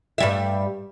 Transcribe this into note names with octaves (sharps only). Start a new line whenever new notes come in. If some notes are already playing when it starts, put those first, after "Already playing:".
G2 G3 E5